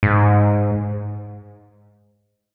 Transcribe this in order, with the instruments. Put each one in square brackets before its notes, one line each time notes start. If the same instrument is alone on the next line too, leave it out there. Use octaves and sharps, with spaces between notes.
[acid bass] G#2